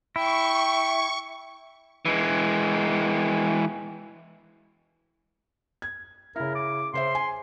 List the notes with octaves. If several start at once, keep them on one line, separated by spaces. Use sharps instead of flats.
E4 G5 C#6
E3 G#3
G#6
C#3 E4 A#4
D6
C#3 C5 E5 C6
G#5